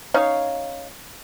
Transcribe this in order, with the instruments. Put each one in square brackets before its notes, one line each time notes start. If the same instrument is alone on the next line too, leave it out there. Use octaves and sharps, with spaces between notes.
[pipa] C#4 D#4 C#5 F5